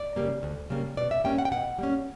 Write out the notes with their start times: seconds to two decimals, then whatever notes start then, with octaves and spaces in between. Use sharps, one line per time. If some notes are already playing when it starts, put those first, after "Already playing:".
Already playing: D5
0.16 C#3 G3 A#3
0.43 D2
0.70 C#3 G3 A#3
0.97 B2 D5
1.11 E5
1.24 G3 A#3 C#4 G5
1.38 F#5
1.45 G5
1.52 B2 F#5
1.79 G3 A#3 C#4